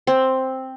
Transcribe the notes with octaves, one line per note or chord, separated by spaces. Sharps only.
C4